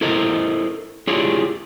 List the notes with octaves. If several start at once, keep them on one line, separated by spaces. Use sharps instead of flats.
E4 A4 A#4 C5 D#5
D4 E4 F4 G4 G#4 C#5